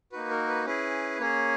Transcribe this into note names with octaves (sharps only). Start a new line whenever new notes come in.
A#3 D#4 F#4 B4
A#4
B4
C#4 E4 G#4 B4
A#3 C#4 G#4 C#5